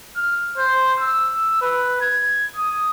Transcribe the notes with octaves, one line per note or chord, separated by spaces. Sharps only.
F6
C5
E6
B4
G#6
D#6